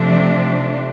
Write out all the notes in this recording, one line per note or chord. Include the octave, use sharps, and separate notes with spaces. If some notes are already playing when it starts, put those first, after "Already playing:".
Already playing: C3 F3 A3 D4